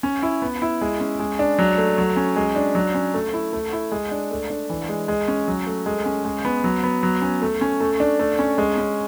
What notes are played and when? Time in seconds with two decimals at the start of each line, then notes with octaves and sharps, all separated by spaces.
0.03 C#4
0.23 E4
0.42 B3
0.62 E4
0.81 G#3
1.00 C#4
1.19 G#3
1.39 D4
1.59 F#3
1.78 A3
1.98 F#3
2.17 C#4
2.36 G#3
2.56 D4
2.75 F#3
2.94 C#4
3.14 A3
3.34 E4
3.53 A3
3.73 E4
3.92 G#3
4.11 D4
4.31 A3
4.50 D4
4.69 E3
4.89 G#3
5.08 G#3
5.28 C#4
5.48 F#3
5.67 A3
5.86 G#3
6.06 C#4
6.25 G#3
6.45 B3
6.64 F#3
6.83 B3
7.03 F#3
7.22 C#4
7.42 A3
7.61 C#4
7.80 A3
8.00 D4
8.19 A3
8.39 C#4
8.58 G#3
8.78 C#4